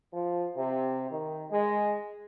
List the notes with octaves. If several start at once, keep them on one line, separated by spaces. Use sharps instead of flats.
F3
C3
D#3
G#3